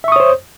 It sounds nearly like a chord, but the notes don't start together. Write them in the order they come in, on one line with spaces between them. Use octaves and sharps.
E5 C#6 D#6 C#5 C5